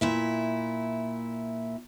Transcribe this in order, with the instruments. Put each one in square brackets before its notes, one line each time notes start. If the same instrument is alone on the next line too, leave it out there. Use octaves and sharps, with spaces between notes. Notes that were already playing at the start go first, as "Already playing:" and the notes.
[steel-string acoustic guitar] A#2 E4 E5